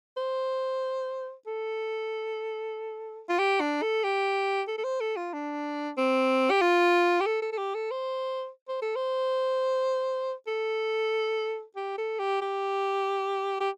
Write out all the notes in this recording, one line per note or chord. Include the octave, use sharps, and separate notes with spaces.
C5
A4
F4
G4
D4
A4
G4
A4
A4
C5
A4
F4
D4
C4
G4
F4
G4
A4
A4
A4
G4
A4
C5
C5
A4
C5
A4
G4
A4
G4
G4
G4